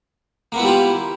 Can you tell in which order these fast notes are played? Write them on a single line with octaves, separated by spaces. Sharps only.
A#3 B3 E4 G3 F4